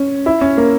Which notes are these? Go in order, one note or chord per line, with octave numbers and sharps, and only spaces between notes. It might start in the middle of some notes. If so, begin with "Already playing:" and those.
Already playing: C#4
E4
C#4
A#3